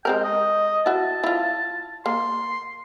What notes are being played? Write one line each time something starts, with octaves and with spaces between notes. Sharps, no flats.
G#3 C4 A#4 G5
D#5
E4 F#4 A5
E4 F4
A#3 C6